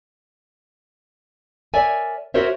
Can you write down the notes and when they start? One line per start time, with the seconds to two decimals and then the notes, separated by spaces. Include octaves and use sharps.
1.74 A#4 C#5 D5 E5 G#5
2.34 F#4 A#4 C5 C#5 E5